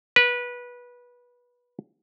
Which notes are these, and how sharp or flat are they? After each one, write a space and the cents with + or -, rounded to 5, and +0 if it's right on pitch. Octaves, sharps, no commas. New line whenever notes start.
B4 -20